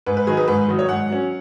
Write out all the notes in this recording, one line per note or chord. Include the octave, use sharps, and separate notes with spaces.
G#2 B4
B4
D#3 F#3 D#4 G#4
B4
G#2 B4
D#3 F#3 D#4
C#5
G#2 F#5
F#3 C#4